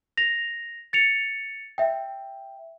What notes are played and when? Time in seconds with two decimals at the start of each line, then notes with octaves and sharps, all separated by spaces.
0.17 A#6 F7
0.93 A6 C#7 F7
1.78 E5 G5